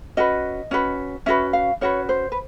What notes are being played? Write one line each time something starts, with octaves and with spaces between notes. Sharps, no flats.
C#4 F#4 B4 D#5
C#4 F#4 B4
C#4 F#4 B4 E5
F5
C#4 F#4 B4 C#5
C5
B4